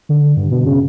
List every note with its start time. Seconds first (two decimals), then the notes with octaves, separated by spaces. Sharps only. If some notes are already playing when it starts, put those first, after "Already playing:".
0.09 D3
0.37 G2
0.51 B2
0.66 C#3